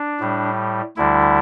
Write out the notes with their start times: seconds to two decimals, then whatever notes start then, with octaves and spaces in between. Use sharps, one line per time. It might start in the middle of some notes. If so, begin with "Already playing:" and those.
Already playing: D4
0.20 A2 G3
0.97 D2 D3 G3 E4